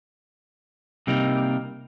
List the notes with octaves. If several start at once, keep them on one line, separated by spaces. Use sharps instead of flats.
C3 G3 A#3 D#4